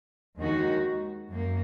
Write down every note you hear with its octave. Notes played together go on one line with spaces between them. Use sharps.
D#2 D#3 G#3 D#4 F#4
F#2 F#3 A#3